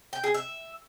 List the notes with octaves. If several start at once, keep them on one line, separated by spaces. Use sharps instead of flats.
G5
G#4
E5